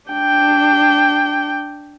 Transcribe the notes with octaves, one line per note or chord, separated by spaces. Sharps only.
D4 G5